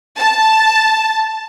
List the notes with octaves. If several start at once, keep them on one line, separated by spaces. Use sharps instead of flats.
A5